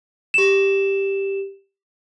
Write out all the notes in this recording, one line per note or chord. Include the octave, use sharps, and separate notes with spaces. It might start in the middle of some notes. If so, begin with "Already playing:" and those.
G4 E7